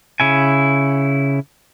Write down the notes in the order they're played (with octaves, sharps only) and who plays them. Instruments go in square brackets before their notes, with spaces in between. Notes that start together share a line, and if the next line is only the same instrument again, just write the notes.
[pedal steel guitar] C#3 E4 G#5